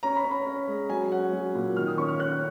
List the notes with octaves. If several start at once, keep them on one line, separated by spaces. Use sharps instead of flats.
C#4 A#5
B5
C#4
B5
C#4
G#3
F#3 G#5
C#4 F#5
F#3
A#2
D#3 F6
D#6
C#4 C#6
F6
C#4 F#6